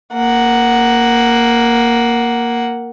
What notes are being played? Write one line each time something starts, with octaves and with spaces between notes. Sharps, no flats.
A#3 F#5